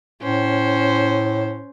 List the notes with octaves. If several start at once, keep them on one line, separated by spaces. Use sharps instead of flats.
A2 C#4 C5